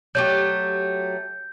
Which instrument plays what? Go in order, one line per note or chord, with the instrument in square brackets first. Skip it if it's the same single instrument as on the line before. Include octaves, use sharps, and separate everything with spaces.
[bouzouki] F#3 A3 G4 [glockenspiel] G6